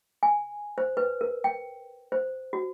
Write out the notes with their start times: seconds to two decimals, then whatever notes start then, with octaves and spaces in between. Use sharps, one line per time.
0.23 G#5
0.78 C5
0.97 B4
1.21 A#4
1.44 G5
2.12 C5
2.53 F#4